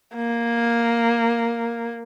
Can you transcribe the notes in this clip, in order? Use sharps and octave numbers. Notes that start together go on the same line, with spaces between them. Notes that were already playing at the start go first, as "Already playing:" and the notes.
A#3